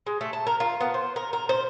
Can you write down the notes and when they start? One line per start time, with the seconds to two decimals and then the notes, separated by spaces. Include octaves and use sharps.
0.06 G#3
0.21 A3
0.33 A5
0.47 A#4
0.60 F4
0.81 B3
0.94 C5
1.16 A#4
1.33 A#4
1.49 C5